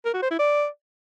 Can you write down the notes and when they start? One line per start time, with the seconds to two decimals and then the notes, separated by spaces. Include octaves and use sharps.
0.05 A#4
0.14 F#4
0.22 C5
0.31 E4
0.39 D5